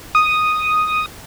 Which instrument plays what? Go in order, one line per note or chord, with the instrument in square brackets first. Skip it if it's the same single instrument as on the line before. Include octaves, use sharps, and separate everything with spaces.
[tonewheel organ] D#6